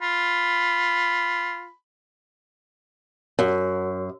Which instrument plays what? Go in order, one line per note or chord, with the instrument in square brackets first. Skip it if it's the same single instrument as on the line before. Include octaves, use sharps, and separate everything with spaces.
[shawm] F4 [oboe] B5
[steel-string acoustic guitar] F#2